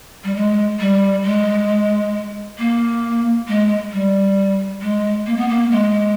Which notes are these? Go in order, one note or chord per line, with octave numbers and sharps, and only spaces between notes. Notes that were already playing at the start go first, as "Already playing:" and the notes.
G3
G#3
G3
G#3
A#3
G#3
G3
G#3
A#3
B3
A#3
G#3